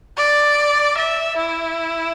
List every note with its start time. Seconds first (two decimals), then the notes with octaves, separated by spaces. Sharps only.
0.17 D5
0.97 E5
1.37 E4